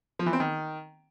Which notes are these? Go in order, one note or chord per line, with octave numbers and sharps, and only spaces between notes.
F3
E3
C4
D#3